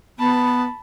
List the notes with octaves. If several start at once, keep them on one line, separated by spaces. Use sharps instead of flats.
B3 A5 B5